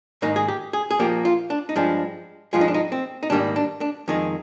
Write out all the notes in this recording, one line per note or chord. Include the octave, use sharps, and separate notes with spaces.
G#2 D#3 A#3 D#4
G#4
G4
G#4
G#4
A#2 F3 A#3 G4
F4
D4
D#4
G2 F3 G#3 D4
G2 F3 G#3 F4
D#4
D4
D#4
C4
D#4
G#2 D#3 G3 A#3 D4
D4
D4
F2 D#3 G#3 D#4